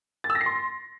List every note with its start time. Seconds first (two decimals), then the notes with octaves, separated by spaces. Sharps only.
0.24 A6
0.30 E6
0.35 A#6
0.41 C7
0.46 C6